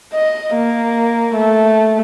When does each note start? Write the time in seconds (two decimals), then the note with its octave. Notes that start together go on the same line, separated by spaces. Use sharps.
0.13 D#5
0.56 A#3
1.35 A3